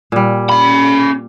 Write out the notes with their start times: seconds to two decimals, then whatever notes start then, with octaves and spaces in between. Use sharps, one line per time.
0.12 A#2 G3
0.49 C#4 B5